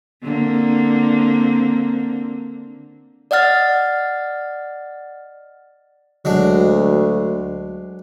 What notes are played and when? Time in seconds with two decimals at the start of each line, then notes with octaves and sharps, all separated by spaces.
0.23 D3 A#3 C4
3.31 D5 D#5 F#5 F6 A6
6.25 D2 F#3 G#3 D4